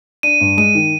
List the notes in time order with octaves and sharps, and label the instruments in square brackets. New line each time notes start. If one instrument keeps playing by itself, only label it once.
[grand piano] D4 [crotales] D#7
[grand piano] G2
[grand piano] G#3 [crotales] D#7
[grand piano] D#3